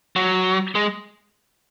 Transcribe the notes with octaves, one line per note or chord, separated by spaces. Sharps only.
F#3
G#3